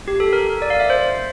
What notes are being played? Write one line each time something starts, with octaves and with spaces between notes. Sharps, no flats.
G4
A4
A#4
D5
F5
E5
C5